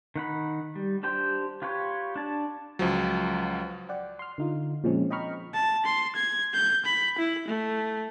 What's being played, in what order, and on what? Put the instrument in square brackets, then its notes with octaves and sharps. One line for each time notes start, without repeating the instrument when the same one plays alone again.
[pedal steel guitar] D#3 F#5 B5
G3
D4 G4 C5 G5
F4 G4 B4 C#5
D4 A5
[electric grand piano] C#2 F3 F#3
[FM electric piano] D5 F#5 G5
C6 F6
D3 D#4 F4
A#2 F3 G#3 C4 C#4
D#5 G5 A#5 B5 C#6 F6
[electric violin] A5
C6
G#6
G6
B5
E4
A3